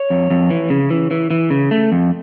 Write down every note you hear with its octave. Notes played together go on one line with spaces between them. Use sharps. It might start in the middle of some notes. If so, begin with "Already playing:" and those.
Already playing: C#5
F2
F2
E3
C#3
E3
E3
E3
C#3
A3
F2